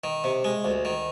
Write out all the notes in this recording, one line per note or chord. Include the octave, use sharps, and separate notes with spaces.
D#3
C3
G#3
D2
D#3